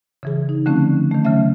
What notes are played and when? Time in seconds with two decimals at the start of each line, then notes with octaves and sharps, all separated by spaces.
0.23 C#3 E3 G#4
0.49 D#4
0.66 D3 F3 A3 C4 C#4
1.11 D#3 A3
1.25 C#3 F#3 A3 C#4 E5